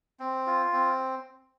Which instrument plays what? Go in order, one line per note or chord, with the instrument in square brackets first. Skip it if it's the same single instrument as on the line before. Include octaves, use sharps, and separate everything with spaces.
[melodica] C4
F4
C4